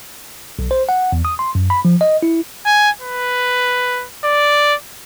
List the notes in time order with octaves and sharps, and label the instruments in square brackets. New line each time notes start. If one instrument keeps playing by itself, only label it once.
[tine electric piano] B1
C5
F#5
E2
D#6
C6
F#2
B5
F3
D#5
E4
[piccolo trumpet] G#5
B4
D5